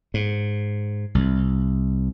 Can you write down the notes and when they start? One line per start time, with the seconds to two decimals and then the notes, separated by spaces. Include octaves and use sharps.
0.14 G#2
1.15 C2